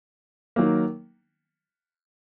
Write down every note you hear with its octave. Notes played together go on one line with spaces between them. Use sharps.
D#3 F#3 A#3